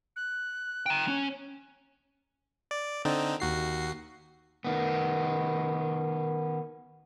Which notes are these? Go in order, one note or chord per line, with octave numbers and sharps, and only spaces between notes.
F#6
G5 A#5
C#4
D5
D3 C4 D#4
D#2 F#4 C7
D#3 B3